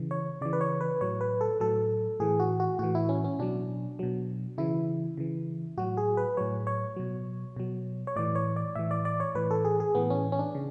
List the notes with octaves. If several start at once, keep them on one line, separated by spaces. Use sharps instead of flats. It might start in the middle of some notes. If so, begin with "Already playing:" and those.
Already playing: C#3 E3
C#5
C#3 E3 D5
B4
C#5
B4
A2 F#3 C#5
B4
A4
A2 F#3 A4
A2 E3 G#4
F#4
F#4
A2 E3 F#4
E4
C#4
C#4
B2 F#3 D4
B2 F#3
C#3 E3 E4
C#3 E3
A2 F#3 F#4
G#4
B4
A2 F#3 C#5
C#5
B2 F#3
B2 F#3
C#5
A2 E3 D5
C#5
D5
A2 E3 E5
D5
D5
C#5
A2 E3 B4
A4
G#4
G#4
A2 E3 B3
C#4
C#4
D4
C#3